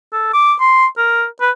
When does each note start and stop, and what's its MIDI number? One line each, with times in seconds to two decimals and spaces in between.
0.13 0.32 69
0.33 0.54 86
0.60 0.86 84
0.98 1.25 70
1.41 1.51 71